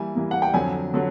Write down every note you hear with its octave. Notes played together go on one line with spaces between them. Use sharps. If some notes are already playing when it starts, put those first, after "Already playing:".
Already playing: E3 G3 A#3 G#5
E3 G3 A#3
F#5
G5
F2 D3 F#3 G#5
D3 F#3